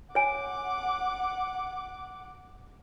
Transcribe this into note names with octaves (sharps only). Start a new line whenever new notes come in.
C#5 F#5 G#5 D6